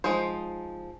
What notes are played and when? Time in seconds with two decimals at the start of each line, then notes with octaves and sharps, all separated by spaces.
0.04 F3 G#3 D#4 C5